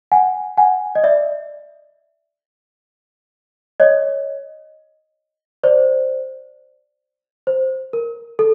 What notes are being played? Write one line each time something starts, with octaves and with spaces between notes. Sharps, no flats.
F#5 G#5
F#5 G#5
D#5
D5 E5
C#5 D#5
C5 D5
C5
A#4
A4